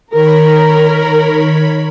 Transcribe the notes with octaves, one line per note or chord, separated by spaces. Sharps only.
D#3 A#4 C#5 B5